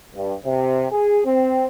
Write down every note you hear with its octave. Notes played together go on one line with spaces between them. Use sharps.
G2
C3
G#4
C4